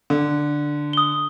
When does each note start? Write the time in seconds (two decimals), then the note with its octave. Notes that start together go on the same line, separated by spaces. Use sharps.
0.10 D3
0.93 D#6 G7